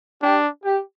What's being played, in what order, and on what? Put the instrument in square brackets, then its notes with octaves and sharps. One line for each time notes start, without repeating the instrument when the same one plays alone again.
[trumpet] D4 [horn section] G4
[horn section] G4